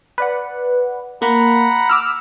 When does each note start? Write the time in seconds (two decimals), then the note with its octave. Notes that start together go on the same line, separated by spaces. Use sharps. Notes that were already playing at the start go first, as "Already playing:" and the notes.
0.18 B4 D5 F#5
1.22 A#3 F#5 A#5 B5
1.89 D6 E6 F6